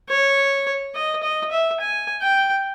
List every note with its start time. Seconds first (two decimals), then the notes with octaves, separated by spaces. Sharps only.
0.09 C#5
0.95 D#5
1.23 D#5
1.51 E5
1.80 G#5
2.22 G5